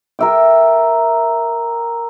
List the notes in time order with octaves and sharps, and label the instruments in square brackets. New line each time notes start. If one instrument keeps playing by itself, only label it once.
[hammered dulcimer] A#4 E5 G5